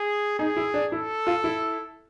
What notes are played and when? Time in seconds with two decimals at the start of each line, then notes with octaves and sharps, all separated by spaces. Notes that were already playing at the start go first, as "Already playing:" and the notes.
Already playing: G#4
0.39 D#4 G#4
0.57 E4
0.74 D4
0.92 E4 A4
1.27 F4
1.44 E4